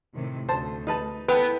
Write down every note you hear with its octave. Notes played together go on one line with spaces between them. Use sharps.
A2 C3 D#3
D2 C5 A5
D#4 B4 A5
B3 E4 A4 B4 G5